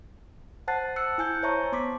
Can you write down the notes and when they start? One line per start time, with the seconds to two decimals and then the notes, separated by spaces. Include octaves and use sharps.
0.68 C5 F#5 A5 F#6 A6 C7
0.96 E6 F#6 C#7
1.18 E4 G#5 G6 C#7
1.43 C5 C#5 E5 A5 A#5 C#6
1.72 B3 C6 D6 B6